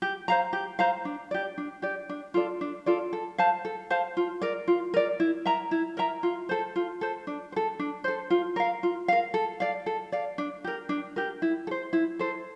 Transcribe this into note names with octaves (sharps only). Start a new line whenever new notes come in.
G4
C5 F5 A#5
G4
C5 F5 A#5
D4
G4 D5
D4
G4 D5
D4
F4 A4 D5
D4
F4 A4 D5
A4
C5 F5 A5
A4
C5 F5 A5
F4
A#4 D5
F4
A#4 D5
E4
A#4 E5 A#5
E4
A#4 E5 A#5
F4
A4 C5
F4
A4 C5
D4
C5
A4
D4
A4 C5
F4
A#4 F5
F4
A#4 F5
A4
D5 F5
A4
D5 F5
D4
G4 A#4
D4
G4 A#4
E4
A4
C5
E4
A4 C5